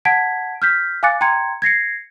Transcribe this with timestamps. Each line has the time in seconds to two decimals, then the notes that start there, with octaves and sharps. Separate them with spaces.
0.05 F#5 A5 G#6 B6 D7
0.62 F6 G6 B6
1.03 F5 G#5 D6 F#6 A6 C#7
1.21 G5 A#5 C6 G#6 C#7
1.62 G#6 A#6 C7 C#7